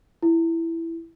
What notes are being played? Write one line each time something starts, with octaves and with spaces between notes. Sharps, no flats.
E4